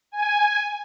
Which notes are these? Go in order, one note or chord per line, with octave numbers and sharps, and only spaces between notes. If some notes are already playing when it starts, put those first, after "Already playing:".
G#5